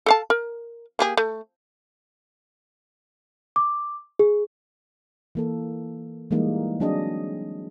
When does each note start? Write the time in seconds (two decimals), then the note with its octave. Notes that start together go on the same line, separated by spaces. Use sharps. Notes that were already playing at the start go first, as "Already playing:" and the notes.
0.06 A4 F5 A5
0.30 A#4
0.99 A#3 G4 G#4
1.17 A3
3.56 D6
4.19 G#4
5.35 E3 A#3 A4
6.31 E3 G3 G#3 A#3 D#4
6.80 F#3 C4 D4 G#4 D#5